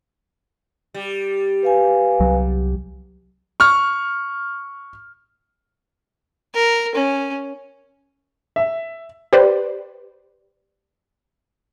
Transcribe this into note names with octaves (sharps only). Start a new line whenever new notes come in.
G3
B4 F5 G#5
C2 F#3
C#6 F6
A#4
C#4
E5
G4 B4 C5 D5